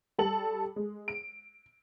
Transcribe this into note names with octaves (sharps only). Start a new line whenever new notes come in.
G3 A4 A5 F#7
G#3
D7